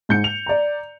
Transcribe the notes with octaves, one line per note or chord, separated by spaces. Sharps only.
G#2 G6 C#7
F7
D5 A#5